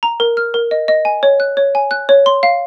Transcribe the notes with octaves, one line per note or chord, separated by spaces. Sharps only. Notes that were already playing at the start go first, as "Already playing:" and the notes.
A#5
A#4
F6
A#4
D#5
D#5
G#5
C#5
F#6
C#5
G#5
F#6
C#5
C6
F5